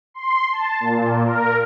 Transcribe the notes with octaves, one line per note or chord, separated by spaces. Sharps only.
C6
A5
A#2
A#4